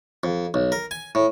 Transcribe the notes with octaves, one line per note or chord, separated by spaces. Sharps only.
F2
B1
A#4
G#5
A2